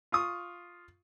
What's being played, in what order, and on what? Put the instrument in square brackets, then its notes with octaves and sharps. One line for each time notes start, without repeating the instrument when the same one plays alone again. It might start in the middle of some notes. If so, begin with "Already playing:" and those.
[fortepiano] F4 C#6 D#6